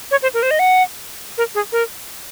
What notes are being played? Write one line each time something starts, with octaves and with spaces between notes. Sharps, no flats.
C#5
C5
A#4
C5
D#5
F#5
A#4
G#4
A#4